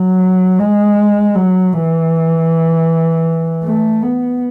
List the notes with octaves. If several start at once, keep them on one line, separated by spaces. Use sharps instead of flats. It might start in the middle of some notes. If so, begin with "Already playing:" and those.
Already playing: F#3
G#3
F#3
E3
A3
B3